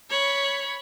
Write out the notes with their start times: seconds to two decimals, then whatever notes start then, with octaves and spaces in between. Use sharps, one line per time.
0.10 C#5 B5